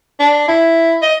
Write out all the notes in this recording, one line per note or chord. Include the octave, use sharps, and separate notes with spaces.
D4
E4
D#5